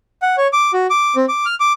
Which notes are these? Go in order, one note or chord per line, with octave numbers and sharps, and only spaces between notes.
F#5
C#5
D6
F#4
D6
C4
D6
F6
D6